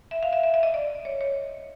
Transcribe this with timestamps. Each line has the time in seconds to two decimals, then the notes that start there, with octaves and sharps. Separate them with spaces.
0.11 E5
0.23 F5
0.33 E5
0.43 E5
0.54 E5
0.63 D#5
0.74 D5
1.05 C#5
1.21 C#5